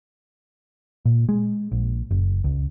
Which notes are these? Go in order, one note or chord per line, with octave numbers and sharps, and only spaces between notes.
A#2
G#3
A#1
F#1
C#2